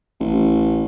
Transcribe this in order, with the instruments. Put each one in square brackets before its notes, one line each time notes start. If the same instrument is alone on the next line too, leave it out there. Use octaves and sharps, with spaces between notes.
[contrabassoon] A1